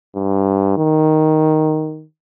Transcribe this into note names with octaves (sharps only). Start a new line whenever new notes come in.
G2
D#3